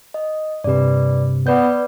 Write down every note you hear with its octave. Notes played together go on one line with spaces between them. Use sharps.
D#5
G2 C3 B4 D5
B3 B4 D5 G6